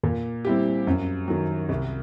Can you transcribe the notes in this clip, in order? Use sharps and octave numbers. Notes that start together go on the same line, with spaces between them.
A#2
G3 C4 E4 G4
F#2
D#3 F#3
C2